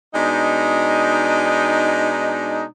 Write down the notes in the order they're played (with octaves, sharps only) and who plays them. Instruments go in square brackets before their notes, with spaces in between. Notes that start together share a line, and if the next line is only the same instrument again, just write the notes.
[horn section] B2 G#3 D4 D#4